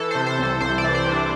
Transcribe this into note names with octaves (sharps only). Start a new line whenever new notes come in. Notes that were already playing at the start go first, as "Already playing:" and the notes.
Already playing: E3 A4
C3 C5
C5
C2 A4
C2 C5
D5
E3
C5
C3
D4